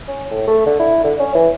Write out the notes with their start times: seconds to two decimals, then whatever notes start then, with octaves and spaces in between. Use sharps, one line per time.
0.08 C#4
0.31 A2
0.47 A3
0.66 D3
0.79 E4
1.04 D3
1.20 C#4
1.35 E3